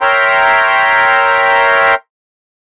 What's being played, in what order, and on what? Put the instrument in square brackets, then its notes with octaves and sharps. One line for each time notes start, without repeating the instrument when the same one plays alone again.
[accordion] A#4 C#5 E5 G5 A#5 C6